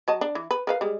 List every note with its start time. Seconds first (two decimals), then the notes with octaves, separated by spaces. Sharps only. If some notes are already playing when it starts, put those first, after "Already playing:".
0.08 F#3 D#5 A5
0.21 D4
0.35 E3
0.51 B4
0.67 A#4 B4 F5
0.81 G3 G#3